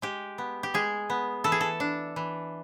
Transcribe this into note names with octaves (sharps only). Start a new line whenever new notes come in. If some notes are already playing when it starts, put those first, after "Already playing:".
G#3 G4
B3
G4
G#3 G#4
B3
E3 A4
G#4
A4
D4
E3